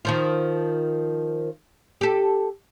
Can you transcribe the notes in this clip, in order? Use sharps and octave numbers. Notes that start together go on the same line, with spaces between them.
D#3 F3 F4
G4 A4